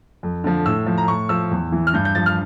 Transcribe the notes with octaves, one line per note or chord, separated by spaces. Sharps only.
F2
D3 F3
A2 E6
F3
A#5
A2 C#6
F3 E6
E2
E3
F6
G2 G6
G6
F3 A6
F6